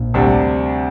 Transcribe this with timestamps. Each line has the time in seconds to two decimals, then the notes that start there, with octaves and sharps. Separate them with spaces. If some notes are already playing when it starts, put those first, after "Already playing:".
Already playing: A#1 A#2
0.14 D2 C3 G3 D4